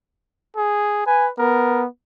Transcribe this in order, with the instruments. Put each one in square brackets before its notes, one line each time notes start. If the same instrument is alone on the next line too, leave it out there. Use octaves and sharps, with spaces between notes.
[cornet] G#4
[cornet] B4 [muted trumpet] G#5
[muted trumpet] B3 [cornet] A#4